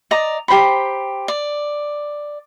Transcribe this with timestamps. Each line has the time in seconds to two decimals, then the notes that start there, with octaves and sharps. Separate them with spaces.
0.11 D5 D#5 A#5
0.48 G4 C5 A#5 B5
1.28 D5